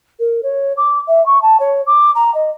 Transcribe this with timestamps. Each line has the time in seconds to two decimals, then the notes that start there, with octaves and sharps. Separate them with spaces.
0.19 A#4
0.43 C#5
0.77 D6
1.07 E5
1.26 C#6
1.42 A5
1.59 C#5
1.86 D6
2.15 A#5
2.34 D#5